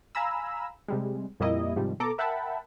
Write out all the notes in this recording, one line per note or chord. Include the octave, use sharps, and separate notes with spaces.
F5 G#5 A#5 B5 E6
C3 G3 G#3
F2 A#2 G3 A#3 E4 D#5
G#2 C3 D#3 F3 G3
B2 A4 A#5 D6
A#4 E5 F#5 G5 A5 B5